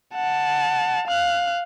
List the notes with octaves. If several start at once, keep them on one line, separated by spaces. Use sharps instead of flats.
F#5 A5
F5 F#6